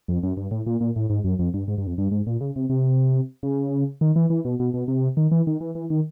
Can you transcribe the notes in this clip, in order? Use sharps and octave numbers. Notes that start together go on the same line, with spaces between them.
F2
F#2
G2
A2
A#2
A#2
A2
G#2
F#2
F2
G2
G#2
G2
F2
G2
G#2
A#2
C#3
C3
C3
C#3
D#3
E3
E3
B2
B2
B2
C3
D#3
E3
D#3
E3
E3
D#3